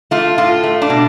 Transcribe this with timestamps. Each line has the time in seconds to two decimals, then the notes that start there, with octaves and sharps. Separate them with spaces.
0.11 A3 F4
0.38 A2 F4
0.63 A3
0.82 D4
0.90 B2